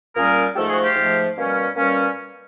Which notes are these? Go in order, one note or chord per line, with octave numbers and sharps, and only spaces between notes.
A#2 G3 A#3 C#4 G#4 A#4
G#2 F3 A3 G4 A4
F#4 G#4
F4 G4
G#2 F3 A3
B2 G3 A#3 C#4
B2 G3 A#3 C#4